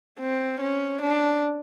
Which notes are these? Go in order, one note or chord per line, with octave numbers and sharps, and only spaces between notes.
C4
C#4
D4